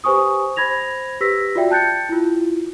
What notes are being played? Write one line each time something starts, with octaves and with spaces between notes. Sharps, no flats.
G4 B4 C5 G#5 C#6 D#6
C5 B5 G#6 A#6 F7
G4 B4 E6 A#6 B6
F4 F#4 D5 E5 G5
G5 A5 F#6 G6 A6 C#7
E4 F4